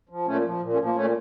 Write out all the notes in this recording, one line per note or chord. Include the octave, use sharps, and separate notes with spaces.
F3
A#2 A3 C#4
F3
A#2
A3 C#4
F3
A#3
A#2 A3 C#4